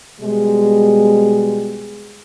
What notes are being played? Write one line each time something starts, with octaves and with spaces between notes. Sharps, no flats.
B2 G3 G#3